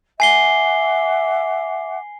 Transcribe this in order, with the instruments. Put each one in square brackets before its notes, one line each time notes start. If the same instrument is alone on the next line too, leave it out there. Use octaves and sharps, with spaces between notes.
[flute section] E5 F#5 D6 [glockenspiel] G#5 C7 G7